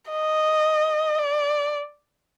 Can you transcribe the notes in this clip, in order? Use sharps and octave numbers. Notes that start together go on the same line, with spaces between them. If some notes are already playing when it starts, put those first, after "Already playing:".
D#5
D5